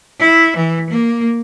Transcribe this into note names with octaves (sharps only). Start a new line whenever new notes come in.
E4
E3
A#3